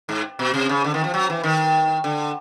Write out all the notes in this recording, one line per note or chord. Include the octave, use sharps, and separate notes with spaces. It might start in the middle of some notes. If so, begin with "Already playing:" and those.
G#2
B2
C3
C#3
D3
D#3
F3
F#3
E3
D#3
D3